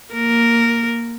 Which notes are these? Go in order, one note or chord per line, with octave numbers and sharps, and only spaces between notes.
A#3 A#4